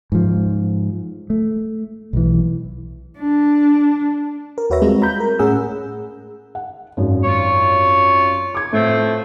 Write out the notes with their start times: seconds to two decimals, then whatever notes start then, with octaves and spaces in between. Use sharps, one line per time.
0.12 G#2 F3
1.30 A3
2.13 B1 E3
3.19 D4
4.58 A#4
4.70 D#2 F#4 B4 C#5 E5 A#6
4.82 G3 G#3 C4 F4 F#4
5.02 A#5 B5 G6
5.20 A#4
5.39 A2 C#4 G#4 F#5 E6
6.55 F#5
6.97 G#1 F#2
7.24 F4 C#5
8.55 D6 G#6
8.73 A2 F3 A3 C4